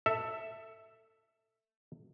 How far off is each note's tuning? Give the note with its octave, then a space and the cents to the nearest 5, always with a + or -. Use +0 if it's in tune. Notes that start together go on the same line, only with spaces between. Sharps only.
A4 +20 E5 +0